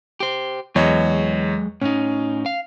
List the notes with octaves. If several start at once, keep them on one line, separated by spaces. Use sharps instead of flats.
G4 C5
E2 F#3 G#3 C#5 D#5
A2 C#4 D#4
F5